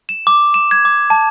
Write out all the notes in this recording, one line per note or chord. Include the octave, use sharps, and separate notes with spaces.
E7
D6
E7
G#6
D6
A5